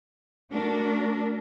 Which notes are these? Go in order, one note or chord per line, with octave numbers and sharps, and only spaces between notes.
A3 D4 F#4 A#4